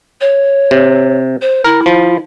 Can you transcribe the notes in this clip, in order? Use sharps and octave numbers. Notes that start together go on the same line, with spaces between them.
C#5
C3
C5
E4 A#4
F3